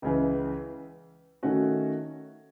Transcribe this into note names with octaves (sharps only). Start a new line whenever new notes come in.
C#2 C#3 E3
D#3 A3 C#4 F#4